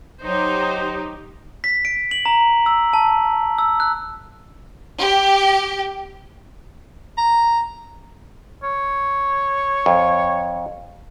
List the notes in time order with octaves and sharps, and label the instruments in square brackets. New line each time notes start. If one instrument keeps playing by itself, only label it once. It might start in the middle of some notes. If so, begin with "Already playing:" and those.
[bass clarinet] F#3 [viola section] D#4 G4 [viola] C5
[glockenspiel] B6
D7
F#7
A#5
E6
A5
E6
F#6
[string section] G4
[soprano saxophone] A#5
[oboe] C#5
[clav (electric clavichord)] F2